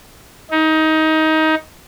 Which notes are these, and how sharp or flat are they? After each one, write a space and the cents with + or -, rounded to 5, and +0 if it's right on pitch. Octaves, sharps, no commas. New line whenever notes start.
D#4 +20